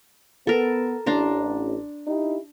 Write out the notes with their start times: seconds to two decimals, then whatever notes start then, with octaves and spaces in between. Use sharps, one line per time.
0.47 B3 A4 A#4
1.06 A1 D4 A#5 C6
2.07 D#4 E4 G4